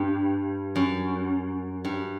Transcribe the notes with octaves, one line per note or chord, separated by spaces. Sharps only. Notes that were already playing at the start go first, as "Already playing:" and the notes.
Already playing: G2
F#2
G2